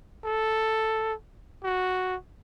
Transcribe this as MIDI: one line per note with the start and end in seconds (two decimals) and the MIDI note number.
0.25 1.13 69
1.64 2.15 66